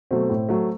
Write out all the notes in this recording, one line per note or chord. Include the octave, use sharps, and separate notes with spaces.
B2 F#3 A3 C4
A2
F#3 A3